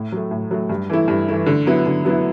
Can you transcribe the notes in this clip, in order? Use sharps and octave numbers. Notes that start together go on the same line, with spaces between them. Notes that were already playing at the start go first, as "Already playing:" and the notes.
Already playing: A2
F#3 A3
A2
F#3 A3
G2
E3 A3 E4
G2
E3 A3 E4
D3
F#3 B3 E4
D3
F#3 B3 E4